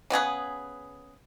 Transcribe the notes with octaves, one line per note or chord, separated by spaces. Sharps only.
C#3 B3 G#4 B4